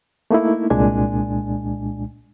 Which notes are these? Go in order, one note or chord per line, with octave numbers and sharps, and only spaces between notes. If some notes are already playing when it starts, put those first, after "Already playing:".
A3 A#3 D#4 E4
C2 A#2 G#3 D4 G#5